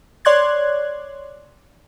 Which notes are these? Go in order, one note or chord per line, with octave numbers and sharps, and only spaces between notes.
C#5 D5 C6 F#6 G#6